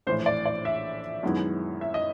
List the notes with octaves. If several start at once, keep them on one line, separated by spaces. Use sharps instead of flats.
A#1 A2 E3 C5
D5
D5
E5
F#2 D#3 G#3 B3 E4
E5
D#5